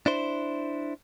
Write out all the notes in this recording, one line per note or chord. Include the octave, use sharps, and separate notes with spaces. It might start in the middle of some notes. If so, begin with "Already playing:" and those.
D4 E4 C5